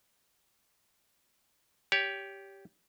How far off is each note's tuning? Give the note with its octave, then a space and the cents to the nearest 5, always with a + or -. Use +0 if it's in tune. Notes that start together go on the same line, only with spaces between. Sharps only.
G4 +0 C#5 +25